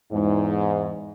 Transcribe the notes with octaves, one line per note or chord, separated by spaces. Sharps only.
E2 G#2